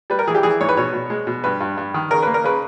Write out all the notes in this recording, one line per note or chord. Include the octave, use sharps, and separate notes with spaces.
G3 B4
A#4
E3 G#4
G4
E3 G#4
G#2 C#5
B4
B2 C#5
B2
G#3
B2
G2 B4
G2
G2
D#3
C#3 A#4
A#3 B4
A#4
C#3 B4